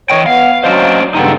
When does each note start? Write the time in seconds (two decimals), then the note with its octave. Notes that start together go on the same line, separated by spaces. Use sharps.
0.10 E3 C#5 D#5 G5
0.26 B3 F5
0.64 F#3 C#4 D4 C5 D#5 F5
1.15 G2 C#3 B3 D#4 G4 A4